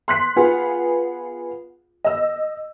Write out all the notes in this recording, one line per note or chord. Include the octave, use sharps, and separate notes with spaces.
C6 F#6 B6
B3 F4 G#4 F#5
D#5 E6